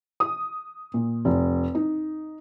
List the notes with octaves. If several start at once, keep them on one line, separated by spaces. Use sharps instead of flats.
D#6
A#2
F1
D#4